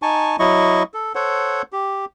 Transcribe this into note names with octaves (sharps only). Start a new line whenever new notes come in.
D#4 G#5 A5 C#6
F#3 E4 D#5 C#6
A4
A4 C5 C#5 F#5
G4